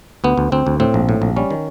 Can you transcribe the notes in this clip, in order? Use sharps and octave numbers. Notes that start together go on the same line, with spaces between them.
D2 B3
D2
D2 C4
D2
A2 C4
A#1
A2
A#1
G3 C#4
D#3